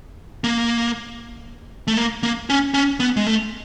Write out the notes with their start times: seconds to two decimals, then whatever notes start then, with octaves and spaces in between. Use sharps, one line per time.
0.44 A#3
1.88 A3
1.97 A#3
2.23 A#3
2.50 C#4
2.74 C#4
3.00 B3
3.17 G#3
3.27 A3